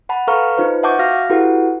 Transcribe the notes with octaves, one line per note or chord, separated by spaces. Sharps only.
F#5 A5 B5
A4 B4 F5 A#5 C#6 F6
D#4 F4 B4 C5
E5 F#5 A5 C#6 D6 G6
F#4 F5 F6 A#6
E4 F#4 G4 A4 B4 F#5